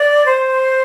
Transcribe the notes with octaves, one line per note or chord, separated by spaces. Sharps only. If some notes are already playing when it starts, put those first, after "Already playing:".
Already playing: D5
C5